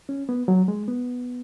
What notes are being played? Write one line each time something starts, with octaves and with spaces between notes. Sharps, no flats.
C#4
B3
F#3
G#3
B3